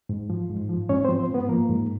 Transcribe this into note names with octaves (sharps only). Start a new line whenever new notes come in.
G#2
F3
G#2
F3
G#2 C#4 C#5
C4 C5
F3
C4 C5
G#2 B3 B4
F3 A#3 A#4
G#2